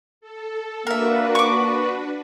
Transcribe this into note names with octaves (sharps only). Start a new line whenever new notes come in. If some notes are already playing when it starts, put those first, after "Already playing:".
A4
A#3 D4 F#4 A#4 B4 E5
C#6 D6